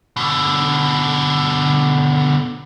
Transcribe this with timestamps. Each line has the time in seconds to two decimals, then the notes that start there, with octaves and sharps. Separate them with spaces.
0.16 B2 D3